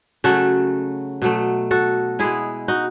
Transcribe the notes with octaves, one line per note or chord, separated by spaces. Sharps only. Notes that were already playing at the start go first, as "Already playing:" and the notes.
C#3 F#3 A3 F#4 A4
B2 F#3 A3
F#4 A4
B2 G#3 E4 G#4
D#4 F#4